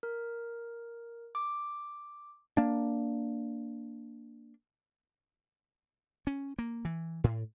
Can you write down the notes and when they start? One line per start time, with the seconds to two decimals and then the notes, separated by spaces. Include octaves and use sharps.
0.03 A#4
1.35 D6
2.57 A#3 D4
6.27 C#4
6.59 A#3
6.85 E3
7.24 A2